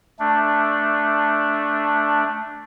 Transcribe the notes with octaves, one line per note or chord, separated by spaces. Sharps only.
A3 D4